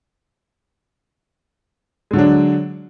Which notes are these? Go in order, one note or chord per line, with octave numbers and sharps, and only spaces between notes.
D3 F#3 G#3 D4